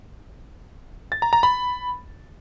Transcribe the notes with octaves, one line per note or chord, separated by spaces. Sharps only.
A6
A#5
A#5
B5